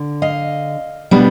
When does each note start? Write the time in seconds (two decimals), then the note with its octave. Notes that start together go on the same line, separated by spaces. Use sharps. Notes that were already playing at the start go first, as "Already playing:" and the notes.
Already playing: D3
0.22 D#5 F5
1.11 B2 G3 B3 D4